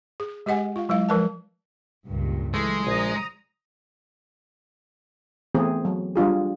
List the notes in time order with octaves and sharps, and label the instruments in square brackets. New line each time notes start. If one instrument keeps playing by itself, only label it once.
[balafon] G#4
G#3 G4 G#4 D#5 F#5 G#5
F4 F5
F#3 G#3 E4 F5
F3 G#3 A#4 B4 D#5 A5
[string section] C#2 G2 A#2
[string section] E3 F#3 [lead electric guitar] G#3 [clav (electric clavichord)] A3 E5
[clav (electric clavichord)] A#1 [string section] A#5 D#6
[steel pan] E3 A3 B3 C4 G#4
F#3
G3 D4 F4 G#4